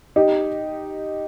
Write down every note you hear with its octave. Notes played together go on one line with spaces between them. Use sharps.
D#4 G4